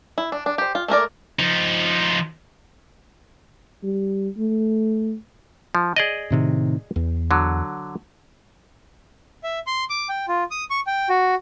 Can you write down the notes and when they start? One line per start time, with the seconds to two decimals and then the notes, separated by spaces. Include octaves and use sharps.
0.18 E4
0.32 D4
0.46 D4
0.58 G4 C5
0.75 F4
0.88 A3 A#3 A#4 D5
1.39 F3 D#4
3.83 G3
4.37 A3
5.75 F3
5.96 G#4 D5 D#5
6.30 A2 C3 D#3
6.96 E2
7.31 D3 F#3
9.43 E5
9.67 C6
9.90 D6
10.09 G5
10.28 F4
10.51 D#6
10.70 C#6
10.87 G5
11.09 F#4